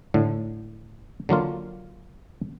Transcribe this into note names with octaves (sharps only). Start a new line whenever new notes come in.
A2 D3
D3 F#3 A#3 F4